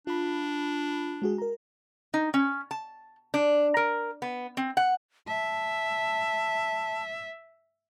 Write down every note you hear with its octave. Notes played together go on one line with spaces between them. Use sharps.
D4 F4 B5
G#3 F#4 G#4
A#4 A#5
D#4
C#4
A5
D4
A#4
B3
C4
F#5
E5 A5